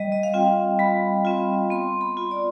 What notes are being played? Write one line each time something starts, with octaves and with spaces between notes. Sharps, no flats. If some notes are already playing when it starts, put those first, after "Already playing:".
Already playing: G3 D#5
D#5
F5
C4 F4 G5
G3 B5
C4 F4
B3 C6
B5
F4
D5